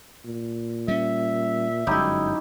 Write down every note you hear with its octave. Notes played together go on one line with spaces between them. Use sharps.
A#2
G3 C#4 E5
G1 F#2 G#3 D#4 E4 G4